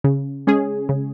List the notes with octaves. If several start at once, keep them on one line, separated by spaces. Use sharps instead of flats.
C#3
G#3 C#4 G#4
C#3